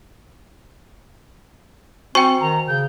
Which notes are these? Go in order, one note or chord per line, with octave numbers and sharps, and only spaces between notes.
C4 F#4 C5 G5 G#5 C#6
D#3 A#5
C#3 G6